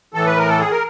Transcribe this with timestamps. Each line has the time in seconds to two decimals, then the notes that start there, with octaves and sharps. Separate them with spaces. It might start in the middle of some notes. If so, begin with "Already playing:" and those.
0.14 A2 E3 A4
0.26 B4
0.37 A#4
0.49 A4
0.60 G#4
0.71 A#4